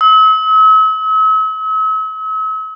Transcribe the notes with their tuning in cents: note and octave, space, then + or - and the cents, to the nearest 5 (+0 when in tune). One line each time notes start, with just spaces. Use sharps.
E6 -45